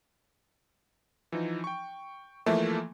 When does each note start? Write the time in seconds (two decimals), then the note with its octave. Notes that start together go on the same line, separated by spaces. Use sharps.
1.32 E3 F3 D#4
1.64 G5 C#6
2.46 E3 F3 A3 A#3